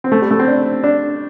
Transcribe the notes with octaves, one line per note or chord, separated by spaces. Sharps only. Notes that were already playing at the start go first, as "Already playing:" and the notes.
C4
A3
G3
A3
C4
D4
D4